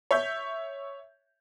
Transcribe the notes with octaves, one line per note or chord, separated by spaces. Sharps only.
C#5 E5 G6